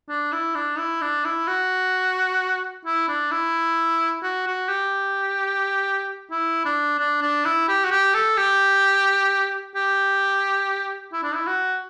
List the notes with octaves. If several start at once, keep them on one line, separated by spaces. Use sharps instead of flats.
D4
E4
D4
E4
D4
E4
F#4
E4
D4
E4
F#4
F#4
G4
E4
D4
D4
D4
E4
G4
F#4
G4
A4
G4
G4
E4
D4
E4
F#4